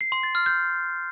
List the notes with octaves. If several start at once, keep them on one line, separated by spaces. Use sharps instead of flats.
C7
C6
A6
F6
G6